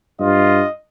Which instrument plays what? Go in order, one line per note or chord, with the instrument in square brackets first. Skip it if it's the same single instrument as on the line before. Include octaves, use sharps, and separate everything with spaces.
[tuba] G2 [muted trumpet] F4 [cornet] D#5